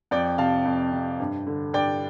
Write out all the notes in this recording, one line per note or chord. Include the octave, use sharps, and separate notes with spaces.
F2 D5 G5
C3 F5 A5
F2
C3
G2
D3
G2 D5 G5